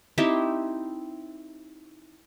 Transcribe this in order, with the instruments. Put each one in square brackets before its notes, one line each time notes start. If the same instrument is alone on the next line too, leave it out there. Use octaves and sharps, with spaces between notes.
[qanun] C4 D#4 E4 G4